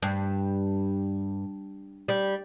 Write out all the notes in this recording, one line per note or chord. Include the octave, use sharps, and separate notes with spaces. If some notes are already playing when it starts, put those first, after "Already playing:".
G2
G3